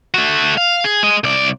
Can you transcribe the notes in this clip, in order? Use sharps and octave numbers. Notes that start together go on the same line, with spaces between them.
A3 F#4
F5
G#4
G#3 D#5
C2 D5